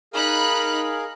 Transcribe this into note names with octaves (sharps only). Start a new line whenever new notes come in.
D#4 G#4 A#4 F5 B5 F#6